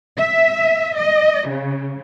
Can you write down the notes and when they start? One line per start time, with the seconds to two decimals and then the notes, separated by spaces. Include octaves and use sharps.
0.18 E5
0.96 D#5
1.47 C#3